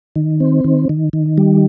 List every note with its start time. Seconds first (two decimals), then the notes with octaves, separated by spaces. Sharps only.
0.16 D#3
0.40 C4
0.64 D#3
0.89 D#3
1.13 D#3
1.38 G3